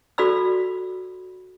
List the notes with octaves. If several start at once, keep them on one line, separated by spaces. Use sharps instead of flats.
F#4 A4 D5 B5 E6